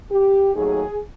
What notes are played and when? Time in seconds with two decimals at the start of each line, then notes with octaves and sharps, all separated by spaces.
0.11 G4
0.54 D#2 D#3 F#3 A3 G#4